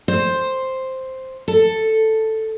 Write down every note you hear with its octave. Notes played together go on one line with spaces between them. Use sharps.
C5
A4